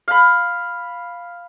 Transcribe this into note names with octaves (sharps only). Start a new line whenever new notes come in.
F5 B5